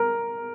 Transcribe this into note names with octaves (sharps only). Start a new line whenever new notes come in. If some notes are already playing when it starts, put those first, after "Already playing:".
Already playing: A#4